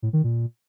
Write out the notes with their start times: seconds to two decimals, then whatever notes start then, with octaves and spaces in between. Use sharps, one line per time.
0.03 A2
0.13 D#3
0.24 A#2